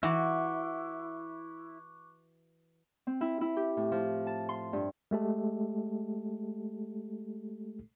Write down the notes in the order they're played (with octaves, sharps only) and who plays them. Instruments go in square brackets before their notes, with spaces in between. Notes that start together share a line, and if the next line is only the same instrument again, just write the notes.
[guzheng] E3 F#4 [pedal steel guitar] E4 [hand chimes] C#6 D6 F#6
[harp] C4
E4
E4
G4
A2
F3
A5
C6
G2
[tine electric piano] G#3 A3 G4 A4